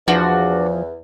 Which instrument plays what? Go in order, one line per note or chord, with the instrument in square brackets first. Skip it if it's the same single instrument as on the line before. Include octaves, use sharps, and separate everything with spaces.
[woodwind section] E2 [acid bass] F3 [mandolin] D4 F#4